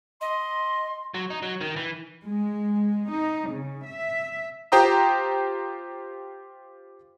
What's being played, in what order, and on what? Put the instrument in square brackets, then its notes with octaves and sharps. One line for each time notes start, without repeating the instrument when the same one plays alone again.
[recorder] D#5 [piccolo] C6
[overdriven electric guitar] F#3
D#4
F#3
D#3
E3
[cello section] G#3
D#4
C#3
E5
[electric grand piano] F4 G4 C5 G5 A#5 D#6